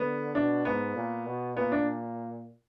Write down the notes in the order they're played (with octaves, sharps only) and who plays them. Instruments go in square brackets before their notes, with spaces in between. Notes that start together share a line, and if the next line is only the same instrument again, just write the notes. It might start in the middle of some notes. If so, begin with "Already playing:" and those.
Already playing: [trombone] D3 [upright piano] B3
[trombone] B2 [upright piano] D4
[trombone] G#2 [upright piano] B3
[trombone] A#2
B2
[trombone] A#2 [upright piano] B3
[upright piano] D4